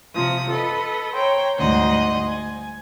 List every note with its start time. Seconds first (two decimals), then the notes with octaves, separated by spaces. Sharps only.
0.15 C3 F3 D#6
0.51 A4 B4 D#5
1.13 C5 C#5 G5 A#5
1.58 D2 G#2 G3 C5 D#5 F#5
2.27 G#5